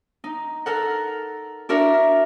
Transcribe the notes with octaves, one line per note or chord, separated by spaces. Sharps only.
D#4
A4 A#4 F#5
D4 E4 F#4 A#4 E5